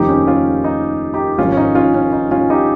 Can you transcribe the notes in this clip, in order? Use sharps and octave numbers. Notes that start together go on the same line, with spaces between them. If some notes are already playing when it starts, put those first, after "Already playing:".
Already playing: F1 D#2 C#3 F3 D#4 G4
C#4
C#4 F4
D#4
D#4 G4
G#1 G#2 F3 C#4 F4
C#4
D#4
C#4 F4
C#4
D#4
C#4 F4
D#4 G4